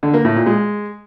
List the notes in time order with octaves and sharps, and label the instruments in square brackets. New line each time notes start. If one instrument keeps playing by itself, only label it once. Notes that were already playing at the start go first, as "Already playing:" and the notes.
[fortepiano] D3
A#3
A2
A#2
G#3